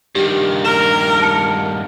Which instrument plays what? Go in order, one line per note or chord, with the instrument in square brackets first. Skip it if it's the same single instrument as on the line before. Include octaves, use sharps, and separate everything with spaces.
[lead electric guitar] G2 D#3 [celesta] G4
[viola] A#4 [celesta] E7
[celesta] A5 F6 C#7